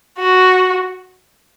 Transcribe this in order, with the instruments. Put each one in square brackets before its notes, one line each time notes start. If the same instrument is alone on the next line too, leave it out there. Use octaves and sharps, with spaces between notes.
[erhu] F#4